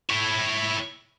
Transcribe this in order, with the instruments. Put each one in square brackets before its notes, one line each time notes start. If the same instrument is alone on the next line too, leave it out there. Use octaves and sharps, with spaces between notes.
[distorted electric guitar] E4 C#5